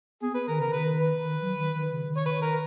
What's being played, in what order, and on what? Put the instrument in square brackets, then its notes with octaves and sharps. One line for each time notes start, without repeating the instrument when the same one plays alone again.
[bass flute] B3 [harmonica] G#4
[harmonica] B4
[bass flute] D#3 [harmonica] A#4
[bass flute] C#3 [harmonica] A#4
[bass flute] D#3 [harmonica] B4
[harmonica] B4
[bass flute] D#3
F#3
D#3
D#3
C#3
D#3
[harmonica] C#5
B4
A#4